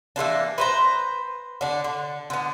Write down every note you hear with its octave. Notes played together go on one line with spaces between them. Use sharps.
E3 G#3 A#3 D4
B4 C5 A#5
D3 D4
D3
D3 B3